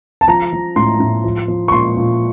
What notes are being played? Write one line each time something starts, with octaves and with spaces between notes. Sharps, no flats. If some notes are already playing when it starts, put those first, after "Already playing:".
A5
F3 A#5
F3
A2 C6
A2
F3
F3
C#6
A#2 C6
A#2